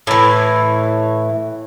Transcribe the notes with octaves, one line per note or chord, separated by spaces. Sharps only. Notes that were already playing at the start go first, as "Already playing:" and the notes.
A2 E3